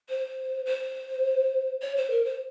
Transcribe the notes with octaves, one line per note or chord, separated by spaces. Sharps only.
C5
C5
C#5
C5
A#4
C5